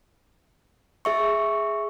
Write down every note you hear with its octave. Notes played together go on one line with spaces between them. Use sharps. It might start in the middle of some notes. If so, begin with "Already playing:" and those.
G#4 E5 C#6